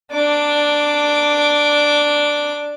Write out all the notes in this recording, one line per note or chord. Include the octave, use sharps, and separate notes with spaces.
D4 D6